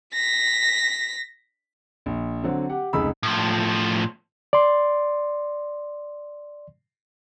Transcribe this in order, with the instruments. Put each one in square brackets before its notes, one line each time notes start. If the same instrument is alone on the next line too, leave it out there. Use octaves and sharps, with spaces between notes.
[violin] A#6 B6
[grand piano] A#1
D3 F#3 C4
G4 F#5
F1 C#2 D#4 G#4 B5 E6
[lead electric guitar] A2 F3
[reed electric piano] D5 C6